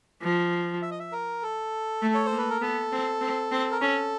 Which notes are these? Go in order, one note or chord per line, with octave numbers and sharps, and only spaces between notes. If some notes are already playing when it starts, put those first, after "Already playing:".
F3
E5
D#5
E5
A#4
A4
A3
C#5
C5
A#3
B4
A#4
B3 A4
C4
C4
C4
A#4
C#4 A4